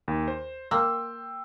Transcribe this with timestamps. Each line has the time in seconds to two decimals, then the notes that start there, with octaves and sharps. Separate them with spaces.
0.08 D#2
0.28 C5
0.71 A#3 G5 C6 E6